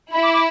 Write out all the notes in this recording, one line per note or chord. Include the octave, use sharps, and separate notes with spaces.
E4 B5
D6
D6